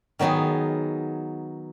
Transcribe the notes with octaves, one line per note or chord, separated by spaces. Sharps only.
D#3 F#3 B3 D#4 G#4